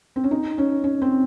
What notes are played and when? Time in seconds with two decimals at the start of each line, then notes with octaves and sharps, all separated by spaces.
0.16 C4
0.24 C#4
0.31 D#4
0.58 C#4
0.84 C#4
1.02 C4